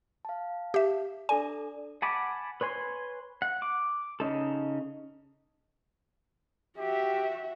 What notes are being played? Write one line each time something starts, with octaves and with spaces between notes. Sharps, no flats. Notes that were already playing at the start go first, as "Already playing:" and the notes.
F5 A5
G4 E5
D4 A4 D5 G#5
F#5 G#5 A5 B5 D6
B4 C#5 G#5 C6
F#5
D6
C#3 C#4 D#4 A4
F#4 G4 E5